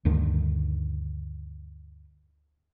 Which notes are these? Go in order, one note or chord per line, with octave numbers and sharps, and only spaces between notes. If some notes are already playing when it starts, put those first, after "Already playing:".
D2 G2 D3 D#3